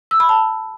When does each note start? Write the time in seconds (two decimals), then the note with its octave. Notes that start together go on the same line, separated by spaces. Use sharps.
0.11 E6
0.20 B5
0.29 A5